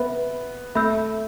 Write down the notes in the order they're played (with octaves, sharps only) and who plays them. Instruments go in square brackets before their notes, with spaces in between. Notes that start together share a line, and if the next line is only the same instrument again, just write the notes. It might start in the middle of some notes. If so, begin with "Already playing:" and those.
Already playing: [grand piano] B3 [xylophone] B4 E5 B5
[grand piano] A3 [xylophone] E5 B5 E6 G6